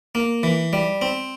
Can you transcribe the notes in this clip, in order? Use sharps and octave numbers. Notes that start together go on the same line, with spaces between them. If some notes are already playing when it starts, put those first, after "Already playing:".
A#3
E3
G3
C4